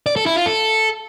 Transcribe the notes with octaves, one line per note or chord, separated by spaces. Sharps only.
D5
A4
E4
F4
A4